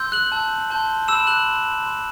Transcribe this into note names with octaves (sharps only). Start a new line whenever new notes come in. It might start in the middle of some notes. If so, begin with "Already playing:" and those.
Already playing: C6 E6 G6
F#6 F#7
A5 E6 G6
A5 C6 G6
B5 D6 E6 G6 E7
F#6 F#7
C6 G6
A5 C6 G6